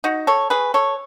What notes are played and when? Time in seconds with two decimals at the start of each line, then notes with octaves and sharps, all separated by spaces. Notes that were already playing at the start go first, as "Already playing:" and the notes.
0.04 D#4 F#4
0.27 A4 C#5
0.50 G#4 B4
0.74 A4 C#5